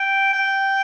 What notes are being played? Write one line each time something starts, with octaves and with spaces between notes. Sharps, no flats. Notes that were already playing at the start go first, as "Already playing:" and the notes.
Already playing: G5
G5